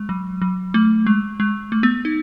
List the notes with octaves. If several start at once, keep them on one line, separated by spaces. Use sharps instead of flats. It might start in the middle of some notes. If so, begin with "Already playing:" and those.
Already playing: G#3
F#3
F#3
A3
G#3
G#3
A3
B3
D#4